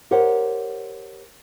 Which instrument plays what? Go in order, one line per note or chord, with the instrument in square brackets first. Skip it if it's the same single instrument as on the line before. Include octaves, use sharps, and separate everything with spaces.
[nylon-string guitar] G4 A#4 C5 C#5 F#5